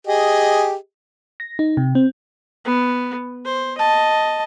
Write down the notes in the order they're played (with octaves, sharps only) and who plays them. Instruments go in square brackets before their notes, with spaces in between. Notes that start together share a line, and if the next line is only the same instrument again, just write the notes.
[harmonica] G4 G#4 D#5
[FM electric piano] A#6
D#4
C3
C4
[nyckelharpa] B3
C5
D#5 A5